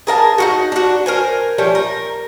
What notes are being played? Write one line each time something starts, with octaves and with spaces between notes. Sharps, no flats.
G#4 A#4 E5 A5
D#4 F4 F#4
D4 F#4
A#4 C5 G#5
F3 G3 A3 C#4
A#4